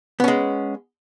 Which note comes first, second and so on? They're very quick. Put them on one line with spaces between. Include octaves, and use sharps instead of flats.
B3 C#4 G#3